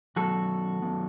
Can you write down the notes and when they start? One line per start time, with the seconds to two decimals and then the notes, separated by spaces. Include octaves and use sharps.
0.16 D#3 F#3 B3 F#4 A4
0.82 D#3 F#3 B3